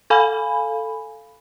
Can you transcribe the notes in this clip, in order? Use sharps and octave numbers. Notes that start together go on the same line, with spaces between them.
A4 F5 G#5 B5